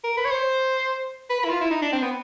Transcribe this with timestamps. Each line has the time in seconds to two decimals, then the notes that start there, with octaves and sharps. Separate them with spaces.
0.04 A#4
0.17 B4
0.25 C#5
0.31 C5
1.30 B4
1.40 B4
1.45 E4
1.50 F4
1.61 E4
1.71 D#4
1.82 D4
1.92 C4
2.03 B3